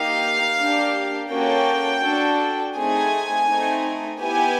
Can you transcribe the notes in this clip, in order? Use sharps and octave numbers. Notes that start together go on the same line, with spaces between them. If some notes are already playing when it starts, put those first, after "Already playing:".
Already playing: A#3 D#4 G4 F5
A#3 D4 G4
A#3 C#4 F#4 A4 G5
D4 F#4 A4
A3 C4 D#4 G#4 G#5
A3 C4 D#4
B3 E4 G4 G#5